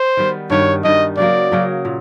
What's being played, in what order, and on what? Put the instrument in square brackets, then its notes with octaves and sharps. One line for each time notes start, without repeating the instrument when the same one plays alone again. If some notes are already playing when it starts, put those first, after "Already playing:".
Already playing: [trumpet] C5
[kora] D#3 G3 B3
[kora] G2 D#3 G3 [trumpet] C#5
[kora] G2 D#3 G3 [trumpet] D#5
[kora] C#3 F#3 A#3 [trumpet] D5
[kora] C#3 F#3 A#3
A#2